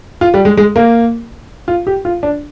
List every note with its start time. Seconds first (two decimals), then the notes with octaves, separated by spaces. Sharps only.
0.21 F4
0.34 G3
0.45 G#3
0.57 G#3
0.76 A#3
1.68 F4
1.87 G4
2.05 F4
2.23 D4